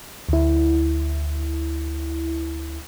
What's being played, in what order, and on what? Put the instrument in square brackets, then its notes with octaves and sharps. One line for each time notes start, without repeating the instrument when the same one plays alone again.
[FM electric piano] D2 E4